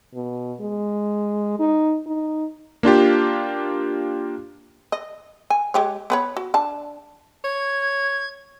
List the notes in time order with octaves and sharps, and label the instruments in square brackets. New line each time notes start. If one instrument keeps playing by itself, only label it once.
[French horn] B2
G#3
D#4
D#4
[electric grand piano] A#3 D4 F4 G4
[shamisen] D#5
G#5
G#3 G4 C#5
B3 B4 C#5
F#4
D4 A5
[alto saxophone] C#5 [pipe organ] G#6